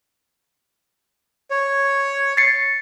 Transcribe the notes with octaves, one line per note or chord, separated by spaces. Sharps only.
C#5
A6 C7 C#7